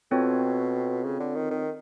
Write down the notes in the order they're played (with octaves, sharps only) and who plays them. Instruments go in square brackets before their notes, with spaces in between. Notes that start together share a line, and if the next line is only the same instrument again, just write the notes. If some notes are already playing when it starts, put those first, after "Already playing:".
[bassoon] B2 [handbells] C4 F4 A4 C#5
[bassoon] C#3
D3
D#3
D#3